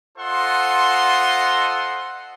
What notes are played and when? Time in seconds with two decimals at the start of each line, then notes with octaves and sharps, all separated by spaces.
0.18 F4 A4 C5 D#5 F#5 C6